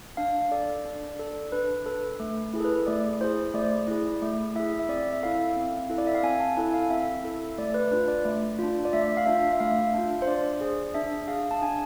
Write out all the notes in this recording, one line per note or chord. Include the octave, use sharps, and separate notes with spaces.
D4 F5
A4 D5
D4
A4
D4 B4
A4 B4
A3
E4 G#4
A4
B4
A3 D5
E4 G#4 C5
A3 D5
E4 G#4
A3
E4 G#4 E5
E5
C4 D5
E5
E4 A4 F5
C4
E4 A4
D5
E5
F5
C4 G#5
A5
E4 A4 G#5
F5
C4 E5
E4 A4
A3 D5
B4
D4 F4 B4
D5
A3
D4 F4
D5
A3 E5
F5
D4 F4 E5
E5
A3 F5
D4 F4
C5
D4 D5
G#4
D4 E5
G#4 F5
A5
D4 G#5